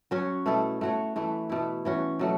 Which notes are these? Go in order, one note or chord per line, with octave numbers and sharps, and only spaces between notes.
F#3 C#4 F#4
B2 A3 E4 A4
A3 F#4 C#5
E3 A3 E4
B2 A3 E4
E3 C#4 F#4
B2 F#3 A3